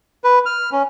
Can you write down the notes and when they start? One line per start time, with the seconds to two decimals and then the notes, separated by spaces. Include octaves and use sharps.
0.24 B4
0.46 F6
0.72 C#4